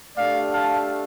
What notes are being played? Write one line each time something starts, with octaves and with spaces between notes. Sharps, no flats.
A3 D4 G4 D5 F5
F5 A5